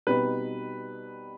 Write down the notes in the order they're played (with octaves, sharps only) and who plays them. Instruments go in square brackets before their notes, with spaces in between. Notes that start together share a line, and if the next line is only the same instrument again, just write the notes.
[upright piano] B2 G3 C4 D#4 B4